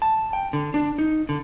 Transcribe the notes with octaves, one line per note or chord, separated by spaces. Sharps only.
A5
G5
D3
D4
D#4
D3